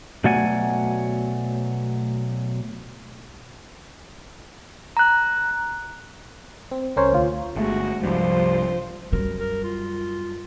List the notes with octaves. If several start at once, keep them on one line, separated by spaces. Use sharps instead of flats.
B2 F#3 A3 D5 F#5 G#5
A#5 F#6
C4
C2 C#4 A#4 C5 C#5
D2 F4
G1 G#3 A3 F#4
C2 G2 F3 F4 C5
F#2 G3 A#4
A#4
F4